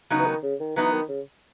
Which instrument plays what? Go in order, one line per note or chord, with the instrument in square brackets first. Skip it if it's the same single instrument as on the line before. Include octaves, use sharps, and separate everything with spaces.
[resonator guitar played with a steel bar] C#3 F#3 B3 D#4
[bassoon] E3
D#3
C#3
D#3
[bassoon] E3 [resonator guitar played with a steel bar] F#3 B3 D#4
[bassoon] D#3
C#3